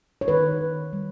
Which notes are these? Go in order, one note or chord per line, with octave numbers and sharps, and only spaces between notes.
C#5
D#3 B4
D#3
G3